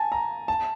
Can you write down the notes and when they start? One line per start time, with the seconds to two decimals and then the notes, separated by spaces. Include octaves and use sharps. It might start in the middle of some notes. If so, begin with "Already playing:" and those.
Already playing: G#5 A5
0.12 A#5
0.48 A5